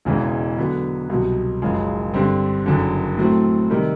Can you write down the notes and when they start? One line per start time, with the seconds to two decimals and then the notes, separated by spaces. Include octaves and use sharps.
0.05 E1 E2 C#3 E3 G#3
0.58 D3 F#3 B3
1.09 C2 B2 F#3
1.62 F#1 F#2 C#3 F3 G#3
2.14 G2 D3 G3 C4
2.66 F#1 F#2 D3
3.18 A2 F#3 A3 C4
3.70 C3 D#3 G3